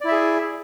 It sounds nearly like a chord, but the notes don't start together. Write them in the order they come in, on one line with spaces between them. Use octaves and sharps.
D5 E4 E5 G#4